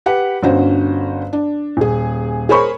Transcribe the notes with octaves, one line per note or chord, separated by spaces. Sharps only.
G4 B4 F#5
G1 D3 C#4 F#4 C5
D4
D#1 G#4
G#4 A#4 C5 C#5 B5 C#6